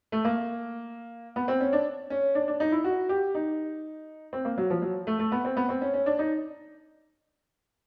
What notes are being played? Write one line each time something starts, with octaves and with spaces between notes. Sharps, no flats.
A3
A#3
B3
C4
C#4
D4
C#4
D4
D4
D#4
E4
F#4
G4
D#4
C4
A#3
F#3
F3
F#3
A3
A3
B3
C4
B3
C4
C#4
C#4
D4
D#4